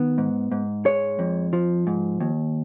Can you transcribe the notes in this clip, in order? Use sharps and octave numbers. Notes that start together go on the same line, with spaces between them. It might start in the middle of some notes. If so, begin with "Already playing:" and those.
Already playing: D#3 B3
G#2
G#2
G#3 C#5
F2
F3
G#2
D#2